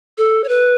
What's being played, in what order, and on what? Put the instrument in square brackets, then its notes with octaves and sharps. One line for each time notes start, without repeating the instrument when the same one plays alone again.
[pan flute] A4
C#5
B4